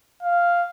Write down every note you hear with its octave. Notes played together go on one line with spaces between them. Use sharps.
F5